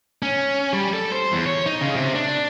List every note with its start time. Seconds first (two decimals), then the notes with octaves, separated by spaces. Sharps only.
0.23 C#4
0.73 G3
0.93 A4
1.12 C5
1.32 E2
1.46 C#5
1.66 D#4
1.81 C#3
1.96 C3
2.15 D4